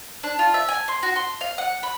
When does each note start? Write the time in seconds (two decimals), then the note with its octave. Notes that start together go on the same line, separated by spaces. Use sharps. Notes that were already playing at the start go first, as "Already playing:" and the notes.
0.24 D4
0.39 F4
0.54 E5
0.69 G#5
0.88 C6
1.03 F#4
1.16 C6
1.41 F5
1.58 F#5
1.83 B5